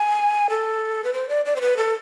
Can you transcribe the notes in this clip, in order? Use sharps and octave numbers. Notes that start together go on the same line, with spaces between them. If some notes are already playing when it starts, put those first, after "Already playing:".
Already playing: G#5
A4
B4
C5
D5
D5
C5
B4
A4